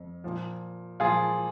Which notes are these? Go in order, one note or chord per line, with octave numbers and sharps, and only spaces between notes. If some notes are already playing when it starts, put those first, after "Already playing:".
Already playing: F2
A#2 F3
A#2 F3 F4 G#4